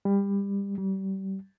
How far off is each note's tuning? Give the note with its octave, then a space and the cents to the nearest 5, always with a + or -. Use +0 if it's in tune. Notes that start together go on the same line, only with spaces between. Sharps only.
G3 +25
G3 -30